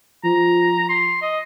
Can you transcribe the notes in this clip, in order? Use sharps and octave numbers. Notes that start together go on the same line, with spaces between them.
F3 A#5
C6
D#5